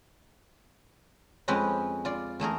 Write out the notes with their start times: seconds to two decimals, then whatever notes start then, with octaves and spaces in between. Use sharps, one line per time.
1.48 F2 G#3 C4 C#4 B4 D#5
2.05 F4 D5
2.40 E2 A3 G#4 A#4